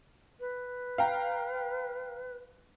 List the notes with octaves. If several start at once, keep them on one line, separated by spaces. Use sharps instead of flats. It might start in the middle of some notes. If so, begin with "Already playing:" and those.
B4
F5 G5 A#5